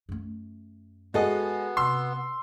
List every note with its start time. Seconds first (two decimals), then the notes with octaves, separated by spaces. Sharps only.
0.09 F#2 A3
1.14 G#3 B3 F#4 A4 D#5
1.77 C3 C6 E6